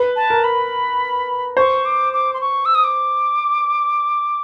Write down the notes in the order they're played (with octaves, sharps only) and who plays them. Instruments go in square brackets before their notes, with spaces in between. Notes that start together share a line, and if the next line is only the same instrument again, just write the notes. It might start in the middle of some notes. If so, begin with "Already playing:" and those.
Already playing: [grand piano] B4
[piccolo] A5
[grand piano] A#4
[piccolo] B5
[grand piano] C5 [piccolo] C#6
[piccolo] D6
D6
C6
C#6
E6
D#6
D6